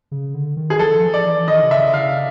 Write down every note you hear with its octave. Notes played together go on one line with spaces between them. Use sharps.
C#3
D3
D#3
G#4
F3 A4
F3
D5
E3
D#3 D#5
C3
C#3 E5
C#3 F5